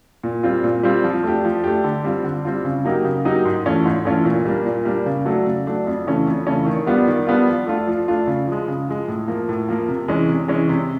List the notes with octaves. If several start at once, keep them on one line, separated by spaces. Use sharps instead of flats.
A#2
G3 C4 F4
A#2
G3 C4 F4
F3
A3 D4 G4
F3
A3 D4 G4
D3
G3 C4 F4
D3
G3 C4 F4
C#3
F#3 A#3 D#4 G4
C#3
F#3 A#3 D#4 G4
G#2
E3 A3 C#4 F4
G#2
E3 A3 C#4 F4
A#2
G3 A#3 D4
A#2
G3 A#3 D4
C#3
F#3 A3 D4
C#3
F#3 A3 D4
F2
C#3 E3 A3 C#4
F2
C#3 E3 A3 C#4
D#3
G3 B3 D4 F4
D#3
G3 B3 D4 F4
F3
A3 D4 F4
F3
A3 D4 F4
C#3
F3 G#3
C#3
F3 G#3
A2
F3 A#3
A2
F3 A#3
C3
E3 G#3 C#4
C3
E3 G#3 C#4
C3